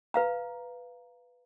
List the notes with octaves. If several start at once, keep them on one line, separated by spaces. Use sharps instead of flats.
B4 F5 A#5